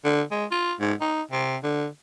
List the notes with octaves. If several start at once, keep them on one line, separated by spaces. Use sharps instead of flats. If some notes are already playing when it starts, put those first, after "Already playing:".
D3
G#3
F4
G#2
D#4
C3
D3